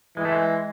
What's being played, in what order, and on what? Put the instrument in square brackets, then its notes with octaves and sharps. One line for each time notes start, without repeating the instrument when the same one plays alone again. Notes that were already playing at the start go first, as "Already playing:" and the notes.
[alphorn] E3 [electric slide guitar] G#3
[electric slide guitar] A3
G#3